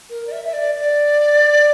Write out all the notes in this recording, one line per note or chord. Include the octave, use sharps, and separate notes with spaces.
A#4
D5
E5
E5
D5
D5